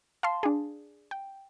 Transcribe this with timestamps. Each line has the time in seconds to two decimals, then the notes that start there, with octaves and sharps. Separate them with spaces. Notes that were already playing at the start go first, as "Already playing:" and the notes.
0.23 F5 A5 C6
0.43 D4 G#4
1.11 G5